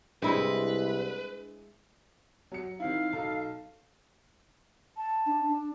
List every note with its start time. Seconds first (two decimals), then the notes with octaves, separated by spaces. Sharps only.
0.22 C2 G#3 D4 E4 G#4 B4 C5
2.52 F#3 C#7
2.80 D#3 C4 E4 F5
3.13 B1 A4
4.97 A5
5.26 D4
5.48 D4